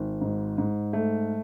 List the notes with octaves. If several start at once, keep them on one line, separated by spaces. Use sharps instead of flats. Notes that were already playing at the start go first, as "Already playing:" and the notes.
Already playing: G#1
G#2
G#2
A3